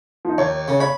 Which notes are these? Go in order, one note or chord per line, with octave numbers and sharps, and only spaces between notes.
F3 D#4
D#2 C#5 G#6
C#3
C#5 B5